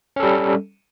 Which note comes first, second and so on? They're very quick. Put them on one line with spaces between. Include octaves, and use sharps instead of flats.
C#4 A4 G3